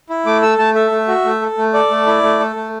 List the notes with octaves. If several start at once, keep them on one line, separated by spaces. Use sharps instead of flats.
E4
A3 D6
A4 E6
A3 A5
A4 E5
A3
F#4
A3
A4
A3
A4 D5
A3
E4
A3
A4
A3